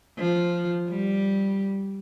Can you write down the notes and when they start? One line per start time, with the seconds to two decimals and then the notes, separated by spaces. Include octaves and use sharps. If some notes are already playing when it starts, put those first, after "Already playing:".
0.19 F3
0.90 G3